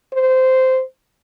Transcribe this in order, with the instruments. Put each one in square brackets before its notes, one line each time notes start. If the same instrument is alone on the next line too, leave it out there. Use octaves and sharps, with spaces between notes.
[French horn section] C5